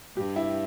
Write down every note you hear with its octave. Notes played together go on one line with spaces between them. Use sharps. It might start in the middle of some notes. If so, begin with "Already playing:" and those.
G2 G4
E4